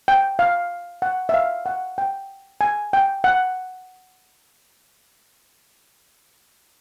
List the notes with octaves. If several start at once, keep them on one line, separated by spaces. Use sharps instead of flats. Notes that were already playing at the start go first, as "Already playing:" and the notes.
G5
F5
F#5
E5
F5
F#5
G5
G#5
G5
F#5